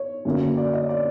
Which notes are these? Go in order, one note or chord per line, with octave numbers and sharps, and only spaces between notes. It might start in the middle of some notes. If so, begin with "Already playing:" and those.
Already playing: C#5
F#2 D3 F#3 A#3 C#4
D5
D#5
D5